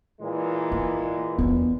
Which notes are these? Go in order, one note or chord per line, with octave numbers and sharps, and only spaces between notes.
A#2 E3 G#3
A#3
E2 B3 D4